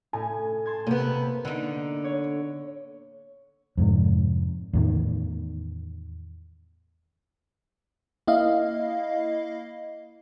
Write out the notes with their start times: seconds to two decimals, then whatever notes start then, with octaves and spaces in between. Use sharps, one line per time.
0.13 A2 G#5
0.66 A5 C6 G#6
0.87 C3 A#3 B3
1.45 D3 B3 D#4
2.04 C#5
3.77 F2 G#2 C3
4.73 E2 A2 D#3
8.27 A#3 E4 D#5 F5